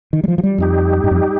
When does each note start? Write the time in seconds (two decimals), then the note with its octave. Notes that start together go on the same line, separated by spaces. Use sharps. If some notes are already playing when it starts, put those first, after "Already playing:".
0.13 D#3
0.24 G3
0.28 F3
0.38 F3
0.43 G3
0.58 F2 G3 D#4 G4
1.04 G2
1.11 F2